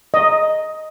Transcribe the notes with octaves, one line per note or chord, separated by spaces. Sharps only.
D#5